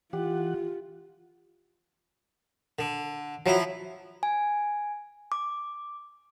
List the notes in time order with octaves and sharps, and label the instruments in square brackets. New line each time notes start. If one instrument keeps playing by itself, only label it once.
[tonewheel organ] E3 F#5 [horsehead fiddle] F4 [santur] G4
[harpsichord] D3
[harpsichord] F3 E4 [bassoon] F#3
[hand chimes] G#5
D6